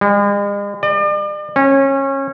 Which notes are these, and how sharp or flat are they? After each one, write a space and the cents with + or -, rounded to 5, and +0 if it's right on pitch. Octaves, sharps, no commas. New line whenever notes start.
G#3 -45
D5 +40
C#4 -25